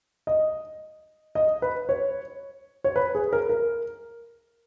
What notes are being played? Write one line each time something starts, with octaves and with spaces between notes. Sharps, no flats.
D#5
D#5
B4
C#5
C#5
B4
G#4
A#4
A#4